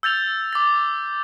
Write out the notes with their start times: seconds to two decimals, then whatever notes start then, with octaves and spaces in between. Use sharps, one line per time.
0.03 E6 G6 A6 F7 G7
0.53 D6 A6